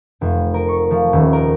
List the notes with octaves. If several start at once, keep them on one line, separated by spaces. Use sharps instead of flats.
F1
A#4
C#6
F3
D#1
A#4